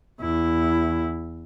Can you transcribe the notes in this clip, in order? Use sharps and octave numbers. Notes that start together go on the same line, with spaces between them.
E2 E4